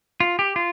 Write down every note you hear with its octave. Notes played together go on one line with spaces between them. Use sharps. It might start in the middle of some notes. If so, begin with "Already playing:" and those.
F4
G4
F4